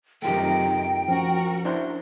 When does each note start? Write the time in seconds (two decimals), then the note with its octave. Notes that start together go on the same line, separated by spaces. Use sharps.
0.22 F#2 C3 D#3 A3 F4 G4 G5
1.08 F3 C#4 F#4 A#4
1.65 D4 E4 C5